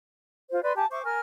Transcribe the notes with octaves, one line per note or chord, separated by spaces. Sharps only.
F4 C5
B4 D5 C6
G4 G#5 A5
C5 E5 C#6 D6
A#4 G#5 F6